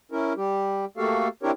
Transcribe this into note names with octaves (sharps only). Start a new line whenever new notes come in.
C#4 E4 A#4
G3 G4
A3 A#3 F#4 G4 A4 F5
C4 D4 E4 G4 A#4 C#5